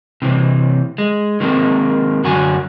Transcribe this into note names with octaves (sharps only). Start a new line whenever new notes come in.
C3 E3 C4
G#3
D#3 G#3 A#3 C4
F#2 D3 F#4 F#5 G#5